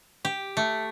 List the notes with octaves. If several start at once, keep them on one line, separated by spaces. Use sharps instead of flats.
G4
A3